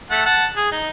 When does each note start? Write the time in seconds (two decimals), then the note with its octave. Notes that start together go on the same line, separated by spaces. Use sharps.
0.11 A3 F#5 A5
0.26 F#5 A5
0.57 G#4
0.72 D#4